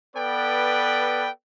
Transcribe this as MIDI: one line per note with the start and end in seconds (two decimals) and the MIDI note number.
0.17 1.29 59
0.17 1.29 69
0.17 1.29 71
0.17 1.29 74
0.17 1.29 79